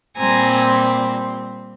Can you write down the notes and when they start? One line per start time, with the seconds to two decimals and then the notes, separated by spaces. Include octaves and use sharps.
0.17 A#2 G3 C4 G#5 A#5